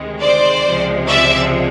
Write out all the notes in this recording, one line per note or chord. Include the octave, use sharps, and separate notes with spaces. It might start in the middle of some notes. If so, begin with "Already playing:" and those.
Already playing: D2 C3 D#3 G#3
C5 D5
C#2 C3 F3 G#3
D5 E5